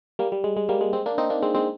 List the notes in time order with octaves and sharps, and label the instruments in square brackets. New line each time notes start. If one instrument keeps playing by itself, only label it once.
[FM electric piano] G3 A#3
G3
G#3
G#3
G3 A#3
G#3
G#3 C4
A#3 D4
C4 D#4
A#3 D4
G#3 C4
G#3 C4